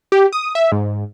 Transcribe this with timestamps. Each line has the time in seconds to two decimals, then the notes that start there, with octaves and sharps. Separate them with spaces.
0.12 G4
0.33 D#6
0.55 E5
0.72 G#2